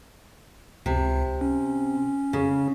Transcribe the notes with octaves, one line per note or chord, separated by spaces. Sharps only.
C#2 C3
C#4
C#3